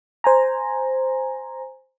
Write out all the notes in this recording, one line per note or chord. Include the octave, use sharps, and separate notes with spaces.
C5 G#5 A#5